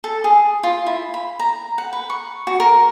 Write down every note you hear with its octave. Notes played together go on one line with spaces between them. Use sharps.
A4
G#4
F4
E4
B5
A#5
F#5
B4
C#6
F#4
A#4